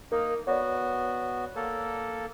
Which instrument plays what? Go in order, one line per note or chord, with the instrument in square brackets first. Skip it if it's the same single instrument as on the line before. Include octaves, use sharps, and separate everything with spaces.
[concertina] A#3 D#4 [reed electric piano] A#4
[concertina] B3 F#4 [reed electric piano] C#5 D5
[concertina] A#3 A4